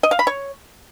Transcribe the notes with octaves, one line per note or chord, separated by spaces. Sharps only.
D#5
F5
B5
C#5